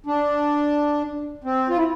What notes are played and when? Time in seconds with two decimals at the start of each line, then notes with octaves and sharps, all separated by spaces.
0.06 D4
1.44 C4
1.69 F4
1.78 E4